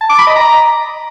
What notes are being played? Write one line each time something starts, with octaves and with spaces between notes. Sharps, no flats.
A5
D6
B5
D#5
A#5